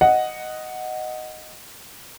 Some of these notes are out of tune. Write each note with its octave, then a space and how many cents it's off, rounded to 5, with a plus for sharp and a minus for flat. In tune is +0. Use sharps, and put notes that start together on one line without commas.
D#5 +0 F#5 +0